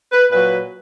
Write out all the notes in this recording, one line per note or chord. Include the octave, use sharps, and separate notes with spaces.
B4
A#2 F#3 B4